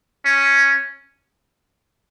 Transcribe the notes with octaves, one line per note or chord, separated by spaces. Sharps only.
C#4